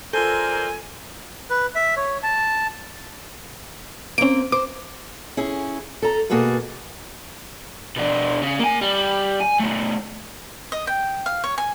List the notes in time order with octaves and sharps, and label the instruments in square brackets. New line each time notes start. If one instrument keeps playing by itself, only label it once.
[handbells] F4 A4 [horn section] A#4 C5 D5 [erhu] G#5
[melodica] B4
E5
C#5
A5
[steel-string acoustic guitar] A#3 C4 [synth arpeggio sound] C#4 D7
[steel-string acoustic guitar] C5 [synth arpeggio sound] D6
[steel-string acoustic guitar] C#4 E4 G#4
A4 A#5
B2 A#3 F#4 G#4 A4 B4
[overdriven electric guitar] B2 D4
C#3
A#3 G#5
G3
G#5
B2 A3
[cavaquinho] D#5
G5
F5
C#5
G#5